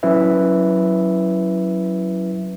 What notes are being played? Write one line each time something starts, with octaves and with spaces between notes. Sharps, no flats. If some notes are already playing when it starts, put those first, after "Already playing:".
F#3 C#4 E4 B4 E5